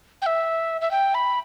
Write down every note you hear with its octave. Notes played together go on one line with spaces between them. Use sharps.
G5
E5
E5
G5
B5